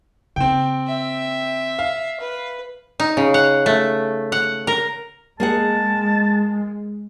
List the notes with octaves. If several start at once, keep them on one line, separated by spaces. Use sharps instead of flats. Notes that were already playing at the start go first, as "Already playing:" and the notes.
C#3 A#3 C4 G5
E5
F5
B4
D#4
C#3
F#5
A3
F#5
A#4
G#3 A#3 G#4 F#5 A5